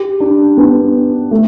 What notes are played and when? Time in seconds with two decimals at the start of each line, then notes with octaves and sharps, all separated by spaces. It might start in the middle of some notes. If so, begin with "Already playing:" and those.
Already playing: G4
0.20 D4
0.57 B3
1.31 A3